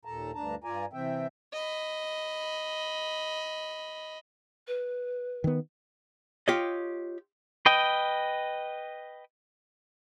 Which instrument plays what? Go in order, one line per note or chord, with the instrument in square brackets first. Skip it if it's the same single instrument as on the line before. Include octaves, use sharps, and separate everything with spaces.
[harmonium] D#2 A#2 A4 A5 A#5
D2 G2 D4 A5 A#5
G2 F4 D5 G#5 A#5
C3 E3 C4 E5 G5
[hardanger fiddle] D#5 B5
[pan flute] B4
[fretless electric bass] D#3 B3
[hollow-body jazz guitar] F4 G4 C#5 D#5
[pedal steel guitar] B4 D#5 G5